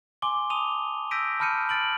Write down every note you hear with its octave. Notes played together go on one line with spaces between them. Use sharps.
G#5 C6 D6 G7
A5 D#6 D#7 F7 G7
E6 G6 A#6 B6 D7 D#7
A5 B5 F6 G6 C#7 D#7
F6 A6 D7 F#7